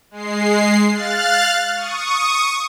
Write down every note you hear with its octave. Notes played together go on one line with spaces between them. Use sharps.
G#3 C7
F5 F6 F#6 A6
C#6 D#6